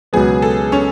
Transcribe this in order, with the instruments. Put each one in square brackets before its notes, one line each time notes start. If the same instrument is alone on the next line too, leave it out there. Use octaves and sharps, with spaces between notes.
[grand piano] C#2 B2 F#3 B3 [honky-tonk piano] G#4
[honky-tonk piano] A4
C#4 C#5